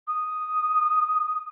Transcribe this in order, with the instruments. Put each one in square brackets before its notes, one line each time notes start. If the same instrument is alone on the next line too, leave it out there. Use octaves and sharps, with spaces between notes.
[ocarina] D#6